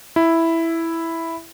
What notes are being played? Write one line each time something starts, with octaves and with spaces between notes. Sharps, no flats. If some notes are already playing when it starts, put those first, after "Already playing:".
E4